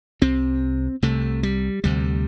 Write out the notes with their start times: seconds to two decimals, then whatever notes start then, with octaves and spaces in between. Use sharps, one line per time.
0.21 C2 C3 C4
1.02 C2 C3 A3
1.43 G3
1.84 D2 C3 G3